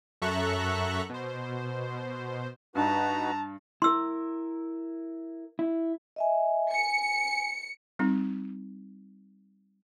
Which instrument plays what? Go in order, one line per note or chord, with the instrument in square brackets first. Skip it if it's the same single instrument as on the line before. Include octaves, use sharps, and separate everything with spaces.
[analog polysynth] F#2 A4 E5 A#5 C#6 F#6
B2 C5
[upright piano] G2 [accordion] D#4 F#4 B4 [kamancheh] A5 A#5
[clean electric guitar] E4 A#4 [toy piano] C6 E6
[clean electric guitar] E4
[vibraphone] D#5 E5 G#5
[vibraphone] G#5 [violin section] C#7
[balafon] G3 C4 D#4